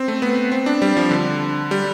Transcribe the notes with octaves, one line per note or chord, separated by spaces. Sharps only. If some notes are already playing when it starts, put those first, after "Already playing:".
Already playing: C4
A3
B3
C4
D4
G3
F3
D3
G3